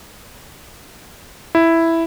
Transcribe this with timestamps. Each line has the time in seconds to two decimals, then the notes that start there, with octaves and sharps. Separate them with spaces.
1.55 E4